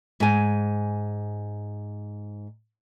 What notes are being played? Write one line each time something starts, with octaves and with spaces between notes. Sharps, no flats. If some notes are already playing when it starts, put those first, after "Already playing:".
G#2 G#5